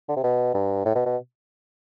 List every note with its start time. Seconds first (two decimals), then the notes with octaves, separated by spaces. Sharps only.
0.09 D3
0.16 C3
0.24 B2
0.54 G2
0.85 A2
0.95 B2
1.06 B2